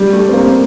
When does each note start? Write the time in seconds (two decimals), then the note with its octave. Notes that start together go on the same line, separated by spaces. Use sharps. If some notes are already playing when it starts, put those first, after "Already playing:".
Already playing: G3
0.13 A3
0.28 C4
0.33 A#3